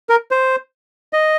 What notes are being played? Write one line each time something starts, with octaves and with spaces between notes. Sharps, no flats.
A#4
C5
D#5